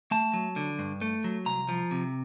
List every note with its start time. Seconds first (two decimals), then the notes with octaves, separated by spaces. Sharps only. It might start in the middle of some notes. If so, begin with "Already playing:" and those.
0.11 A3 A5
0.33 F#3
0.56 D3
0.79 G2
1.01 A3
1.24 F#3
1.46 C2 A#5
1.69 F3
1.91 C3